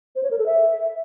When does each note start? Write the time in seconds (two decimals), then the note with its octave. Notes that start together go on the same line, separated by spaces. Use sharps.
0.16 C5
0.23 C#5
0.31 A#4
0.38 A4
0.46 E5